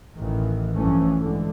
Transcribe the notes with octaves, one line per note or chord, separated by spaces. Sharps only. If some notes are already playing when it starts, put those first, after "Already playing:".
A1 D#3 E3
A1 G2 E3 F3 A3 C#4
D3 E3 G#3